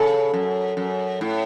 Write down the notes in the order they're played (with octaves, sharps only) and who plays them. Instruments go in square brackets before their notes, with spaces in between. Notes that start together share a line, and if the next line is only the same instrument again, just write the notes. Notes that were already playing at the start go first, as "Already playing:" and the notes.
Already playing: [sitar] C#3 [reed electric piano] A4
[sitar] F#2
F#2
A2